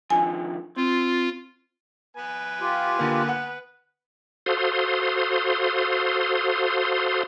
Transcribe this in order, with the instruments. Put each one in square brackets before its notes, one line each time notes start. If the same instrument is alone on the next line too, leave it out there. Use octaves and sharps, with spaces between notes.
[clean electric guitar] D3 D#3 F3 [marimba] G#5
[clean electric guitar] C4 [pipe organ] F4
[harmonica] B3 B4 G#5
[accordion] F4 G4
[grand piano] D3 A#3
F#5
[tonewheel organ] F#4 A4 C5 F5 C6 D#6